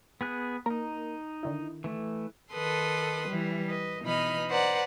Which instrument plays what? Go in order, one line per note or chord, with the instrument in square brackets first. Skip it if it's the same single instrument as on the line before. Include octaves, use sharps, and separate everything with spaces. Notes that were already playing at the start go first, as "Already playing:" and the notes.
[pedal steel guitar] B3 G#4 F#6
[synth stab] A#3 A#4 [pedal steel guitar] D#4 A#5
[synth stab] D3 D#3 E4
[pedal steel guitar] E3 A3
[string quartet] D#3 A4 B4 C6 D#6
E3 G3
B4 D#5
B2 E3 D#4 D#5 B5 F6
B4 C5 D5 F#5 A#5